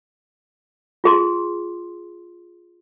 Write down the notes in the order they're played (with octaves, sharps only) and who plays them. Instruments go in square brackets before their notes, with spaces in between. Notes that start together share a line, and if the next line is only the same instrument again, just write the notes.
[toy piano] F4 G#4 C6